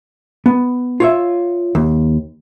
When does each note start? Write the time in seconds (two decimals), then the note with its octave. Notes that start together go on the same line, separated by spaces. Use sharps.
0.46 B3
1.00 F4 C#5 E5
1.75 D#2